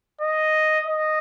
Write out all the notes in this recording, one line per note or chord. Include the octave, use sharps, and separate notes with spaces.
D#5
D#5